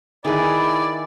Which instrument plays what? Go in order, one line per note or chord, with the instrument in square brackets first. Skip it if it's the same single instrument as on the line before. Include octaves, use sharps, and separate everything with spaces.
[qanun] D#3 B4 [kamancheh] E4 G#4 [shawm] D5 [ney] B5